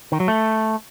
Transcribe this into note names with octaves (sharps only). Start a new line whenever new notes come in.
D#3
F#3
A3